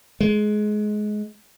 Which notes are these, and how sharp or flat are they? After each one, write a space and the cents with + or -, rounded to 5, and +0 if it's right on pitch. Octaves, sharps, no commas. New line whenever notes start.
G#3 +20